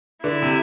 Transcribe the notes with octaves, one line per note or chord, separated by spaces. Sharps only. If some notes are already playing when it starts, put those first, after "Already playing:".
D3 E4
C3